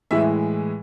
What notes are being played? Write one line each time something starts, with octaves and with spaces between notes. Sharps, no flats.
A2 E3 G#3 E5